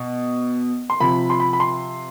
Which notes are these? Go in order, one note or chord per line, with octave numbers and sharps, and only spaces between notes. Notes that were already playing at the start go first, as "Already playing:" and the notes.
Already playing: B2
C6
C3 F3 B5
C6
B5
B5
C6